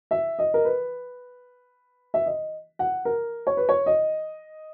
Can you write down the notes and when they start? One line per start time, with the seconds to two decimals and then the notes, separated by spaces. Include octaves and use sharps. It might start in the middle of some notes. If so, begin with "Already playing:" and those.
0.11 E5
0.39 D#5
0.54 A#4
0.65 B4
2.14 E5
2.26 D#5
2.79 F#5
3.05 A#4
3.47 C#5
3.57 B4
3.69 C#5
3.86 D#5